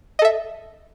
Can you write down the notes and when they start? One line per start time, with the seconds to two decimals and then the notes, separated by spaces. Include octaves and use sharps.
0.19 D#5
0.22 A4
0.25 E5